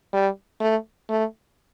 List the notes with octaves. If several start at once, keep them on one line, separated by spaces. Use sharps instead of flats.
G3
A3
A3